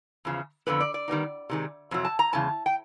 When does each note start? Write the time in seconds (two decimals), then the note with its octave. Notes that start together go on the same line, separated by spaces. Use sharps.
0.25 E2 C#3 F3
0.67 F2 D3 G3 B3 B4
0.80 D5
0.94 D5
1.08 D#3 G3 B3 D#4
1.50 C3 D#3 G#3
1.91 F2 C3 F#3
2.05 A5
2.19 A#5
2.33 E2 C#3 G#3 A5
2.66 G5